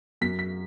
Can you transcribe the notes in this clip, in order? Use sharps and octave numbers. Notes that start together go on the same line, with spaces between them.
F#2 B6
B6